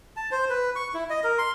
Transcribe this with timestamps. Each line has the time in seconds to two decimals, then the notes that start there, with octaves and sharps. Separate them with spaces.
0.17 A5
0.31 C5
0.50 B4
0.76 C#6
0.94 E4
1.10 D#5
1.24 A#4
1.38 C6